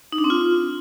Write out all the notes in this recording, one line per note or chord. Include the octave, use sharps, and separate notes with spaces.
D#4
D4
C4
F4